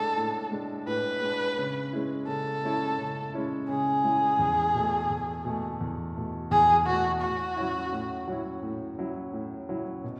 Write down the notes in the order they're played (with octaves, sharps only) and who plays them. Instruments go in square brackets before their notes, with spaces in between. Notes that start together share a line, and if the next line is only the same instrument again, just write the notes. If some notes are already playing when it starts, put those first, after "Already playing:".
Already playing: [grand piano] A2 G#3 D4 [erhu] A4
[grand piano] A2
G#3 D4
[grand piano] A2 [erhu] B4
[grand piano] G#3 D4
C#3
G#3 C#4 E4
[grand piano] C#3 [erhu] A4
[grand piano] G#3 C#4 E4
C#3
G#3 C#4 E4
[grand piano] C#3 [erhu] G#4
[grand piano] G#3 C#4 E4
E2
B2 A3
E2
B2 A3
E2
B2 A3
[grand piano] E2 [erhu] G#4
[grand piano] B2 A3 [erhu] F#4
[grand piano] A2 [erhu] F#4
[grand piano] F#3 C#4 E4
A2
F#3 C#4 E4
A2
F#3 C#4 E4
A2
F#3 C#4 E4
B2